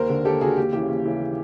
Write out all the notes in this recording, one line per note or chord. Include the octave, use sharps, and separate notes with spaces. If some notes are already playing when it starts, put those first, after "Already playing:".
Already playing: D#2 A#4 C5
D3
D#2 G4 A4
D3 F#4 G#4
D#2 G4
C#3 E3 G4
D#2
C#3 E3